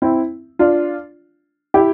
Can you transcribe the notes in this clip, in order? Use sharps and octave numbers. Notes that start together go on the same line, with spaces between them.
C4 E4
D4 F4
E4 G4